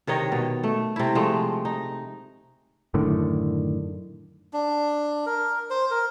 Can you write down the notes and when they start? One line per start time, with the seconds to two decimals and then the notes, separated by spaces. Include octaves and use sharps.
0.07 C3 D#3 C#5 D#5
0.32 B2
0.64 A3
0.96 C3 E4
1.15 F3 G#3 A3
1.65 D#4
2.94 F#2 A2 D3 D#3
4.53 D4
5.26 A#4
5.70 C5
5.91 A#4